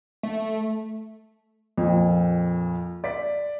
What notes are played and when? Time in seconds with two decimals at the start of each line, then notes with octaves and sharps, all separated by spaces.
0.23 A3
1.78 F2 A#2
3.04 D5 B6